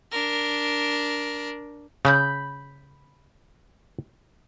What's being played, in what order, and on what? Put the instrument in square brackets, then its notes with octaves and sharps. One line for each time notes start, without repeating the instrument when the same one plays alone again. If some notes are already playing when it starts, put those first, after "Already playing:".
[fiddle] D4 A#4
[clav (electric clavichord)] C#3 [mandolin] B5 F#6 G6